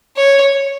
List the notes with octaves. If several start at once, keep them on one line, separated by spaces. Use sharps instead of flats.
C#5